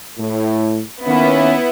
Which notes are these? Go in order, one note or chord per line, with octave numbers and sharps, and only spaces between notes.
A2
D#3 A#3 B3 C#4 E4